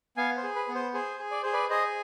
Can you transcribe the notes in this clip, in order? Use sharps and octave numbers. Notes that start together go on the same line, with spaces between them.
B3 F5 G#5
C5
G#4
B4
B3
C5
G#4 C5
G#4
D5
G#4 C5
B4 D5
G#4 C5 D#5